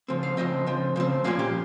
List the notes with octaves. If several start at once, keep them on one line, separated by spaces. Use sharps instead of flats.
C#3 F3 C4
F5
C#3 F3 C4 D#5
C#3 F3 C4
C#3 F3 C4
A#2 F3 A#3 C#4 F5
G4